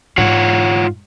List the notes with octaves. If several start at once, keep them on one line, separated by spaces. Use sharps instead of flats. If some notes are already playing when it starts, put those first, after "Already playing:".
G#2 F4 C#5 F#5